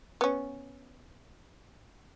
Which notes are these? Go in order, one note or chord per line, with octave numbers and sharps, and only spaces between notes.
B3 C#4